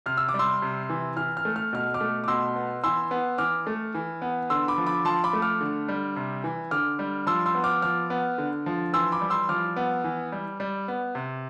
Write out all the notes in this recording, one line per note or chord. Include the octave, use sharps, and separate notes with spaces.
C3 F6
E6
D6
G3
C6 E6
C3
E3
E3 F6
F6
A3
F6
B2 F6
D6 F6
A3
D6
B2 C6 E6
B3
E3 C6 E6
B3
E3 D6 F6
A3
E3
B3
D3 C6 E6
B5 D6
F3
B5 D6
F3 A5 C6
B5 D6
A3
D6 F6
D3
G3
C3
E3
D3 D6 F6
G3
F3 C6 E6
C6 E6
B3
D6 F6
F3 D6 F6
B3
D3
F3
E3 C6 E6
B5 D6
G3
C6 E6
F3 D6 F6
B3
E3
G3
G3
B3
C3